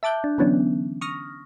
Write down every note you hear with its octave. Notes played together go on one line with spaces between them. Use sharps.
E5 A5 D6 F#6 G6
D4
D3 E3 F#3 B3 C#4 D4
C#6 D#6 F6 A#6